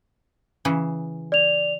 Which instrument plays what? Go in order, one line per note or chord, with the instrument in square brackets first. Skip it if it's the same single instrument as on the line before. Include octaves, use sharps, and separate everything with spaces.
[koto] C#3 E3
[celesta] D5 F7